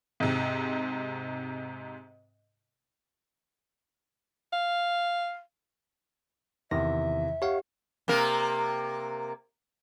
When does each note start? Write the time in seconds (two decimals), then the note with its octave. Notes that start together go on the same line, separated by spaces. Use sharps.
0.20 G#2 C3
4.52 F5
6.71 E2 C3 D#3 E5 A#6
7.42 G4 C#5 F5 F#5 C#6
8.08 C3 A#3 A#4